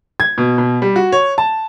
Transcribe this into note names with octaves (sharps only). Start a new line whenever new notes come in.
G#6
B2
B2
G3
F#4
C#5
A5